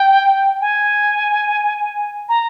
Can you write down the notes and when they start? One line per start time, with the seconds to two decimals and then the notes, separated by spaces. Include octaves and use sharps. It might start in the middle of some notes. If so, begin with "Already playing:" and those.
Already playing: G5
0.61 G#5
2.29 A#5